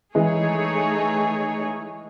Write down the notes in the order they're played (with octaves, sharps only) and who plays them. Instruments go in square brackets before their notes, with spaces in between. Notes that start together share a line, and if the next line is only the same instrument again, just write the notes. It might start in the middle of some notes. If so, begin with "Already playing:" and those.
[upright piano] E3 G#3 [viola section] A3 D#4 G#4 C#5